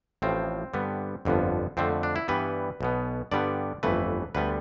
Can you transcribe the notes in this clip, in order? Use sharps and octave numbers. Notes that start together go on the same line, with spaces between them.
A1 A2 F3 C4
G2 D3 G3 B3
G1 F2 D3 F3 B3
F2 D3 A3 C4
D4
E4
G2 E3 G3 B3 B4
B1 B2 B3
G2 D3 G3 B3 D5
G1 F2 E3 A3 B4
D2 D3 G3 B3 B4